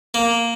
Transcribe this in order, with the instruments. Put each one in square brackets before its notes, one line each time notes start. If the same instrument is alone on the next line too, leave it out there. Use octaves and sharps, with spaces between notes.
[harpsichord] A#3